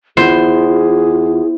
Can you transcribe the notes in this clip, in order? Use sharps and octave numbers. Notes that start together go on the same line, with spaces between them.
E2 F4 G#4 C5